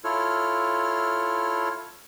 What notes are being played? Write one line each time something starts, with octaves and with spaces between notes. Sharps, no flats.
E4 F4 A4 C#5 F6